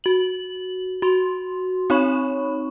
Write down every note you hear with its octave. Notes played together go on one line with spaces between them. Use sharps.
F#4 F#7
F#4 C6
C4 D#4 C#5 B5 C#6